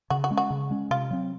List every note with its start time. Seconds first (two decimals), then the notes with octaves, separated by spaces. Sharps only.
0.10 C#3 F#4
0.24 F#4
0.31 G#3 C#4
0.37 F#4
0.50 C#3
0.70 G#3 C#4
0.91 C3 F4
1.11 F#3 C4